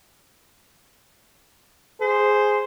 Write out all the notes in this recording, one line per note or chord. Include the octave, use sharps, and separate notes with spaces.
G#4 C5